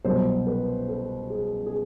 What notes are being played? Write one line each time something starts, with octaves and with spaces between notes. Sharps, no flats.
C2 B2 F#3 C5
B4
A4
G#4
G#4